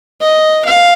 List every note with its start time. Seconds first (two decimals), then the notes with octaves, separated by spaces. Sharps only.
0.21 D#5
0.65 F5